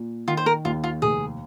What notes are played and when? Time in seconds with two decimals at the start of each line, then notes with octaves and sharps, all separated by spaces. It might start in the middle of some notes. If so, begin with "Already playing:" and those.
Already playing: A#2
0.28 D#3 F4
0.37 C5
0.46 A#4
0.65 D#2 F4
0.84 F4
1.02 F1 G#4